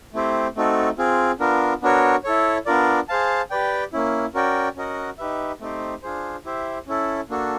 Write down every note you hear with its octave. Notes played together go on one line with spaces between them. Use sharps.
A3 C4 E4 G4 C5
A3 C4 D#4 F#4 A4
C4 F4 G#4
B3 D4 F4 A#4
B3 D4 F#4 A#4 C#5
E4 A4 C#5
B3 D4 F4 A#4 D5
G#4 C5 F5 A5
G4 B4 D5 G5
A#3 C#4 E4
C#4 F#4 A#4 D5 G5
C#4 F#4 A#4 D#5 F#5
D#4 G4 B4 E5
A3 C4 D#4 G4 C5
D4 F4 G#4 C5
E4 G4 C5 E5
C#4 E4 A4
A#3 D4 F#4 A4